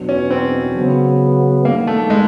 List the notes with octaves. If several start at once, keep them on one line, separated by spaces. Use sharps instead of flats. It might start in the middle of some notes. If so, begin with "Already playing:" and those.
Already playing: E2 B2 F#3 B3 D4
C#4
C4
C#3 F#3 B3
G2 D#3 G3 A#3 B3
A3
G#3